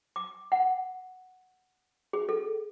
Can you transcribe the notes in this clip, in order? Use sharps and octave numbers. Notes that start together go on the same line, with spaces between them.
D6
F#5
G#4
A4